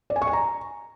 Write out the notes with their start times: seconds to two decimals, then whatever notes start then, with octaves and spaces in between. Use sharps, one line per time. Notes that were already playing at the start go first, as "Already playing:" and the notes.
0.10 D5
0.16 G#5
0.22 C#6
0.27 G#5
0.33 A#5